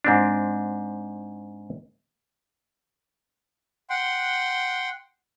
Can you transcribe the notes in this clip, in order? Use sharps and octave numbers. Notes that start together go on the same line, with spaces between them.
G#2 C4 D4
F#5 G5 C6